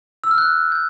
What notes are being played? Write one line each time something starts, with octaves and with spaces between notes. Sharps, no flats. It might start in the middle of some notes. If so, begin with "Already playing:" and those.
E6
F6
F#6
G6